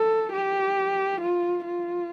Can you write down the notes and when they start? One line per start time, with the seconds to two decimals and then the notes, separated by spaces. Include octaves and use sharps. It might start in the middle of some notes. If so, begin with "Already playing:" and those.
Already playing: A4
0.33 G4
1.21 F4
1.65 F4